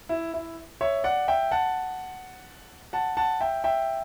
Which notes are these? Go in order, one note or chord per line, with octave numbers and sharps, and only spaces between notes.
E4
E4
C#5 E5
D5 F#5
E5 G5
F#5 A5
F#5 A5
F#5 A5
E5 G5
E5 G5